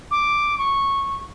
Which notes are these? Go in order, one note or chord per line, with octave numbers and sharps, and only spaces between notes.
D6
C#6